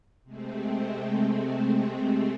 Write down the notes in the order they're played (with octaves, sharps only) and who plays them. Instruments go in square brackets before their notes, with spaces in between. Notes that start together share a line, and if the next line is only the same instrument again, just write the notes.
[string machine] C3 G#3 A3 C4